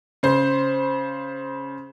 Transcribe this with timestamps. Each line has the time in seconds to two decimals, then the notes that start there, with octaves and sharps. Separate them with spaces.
0.23 C#3 C5